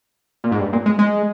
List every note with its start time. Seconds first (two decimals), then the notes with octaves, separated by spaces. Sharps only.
0.44 A#2
0.52 G#2
0.59 G2
0.73 A#2
0.86 G#3
0.99 G#3